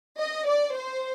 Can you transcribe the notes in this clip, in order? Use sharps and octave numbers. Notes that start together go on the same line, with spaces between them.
D#5
D5
C5